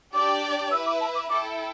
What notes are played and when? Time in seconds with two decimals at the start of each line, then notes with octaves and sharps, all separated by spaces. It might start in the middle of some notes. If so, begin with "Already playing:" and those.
0.14 D4 G4 D5 G5 D6
0.71 E4 B4 E5 E6
0.86 D6
1.01 A5
1.15 D6
1.30 E4 A4 G5 D6